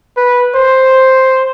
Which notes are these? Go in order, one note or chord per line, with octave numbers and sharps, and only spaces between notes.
B4
C5